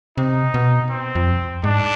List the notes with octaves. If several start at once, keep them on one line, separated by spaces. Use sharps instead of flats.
C3 D#4
B2
C4
F2
G#2 D4